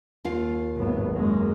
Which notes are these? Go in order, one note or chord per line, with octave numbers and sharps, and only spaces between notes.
D#2 F4 F5
G#1 F#3 B3
F#2 G#3 A#3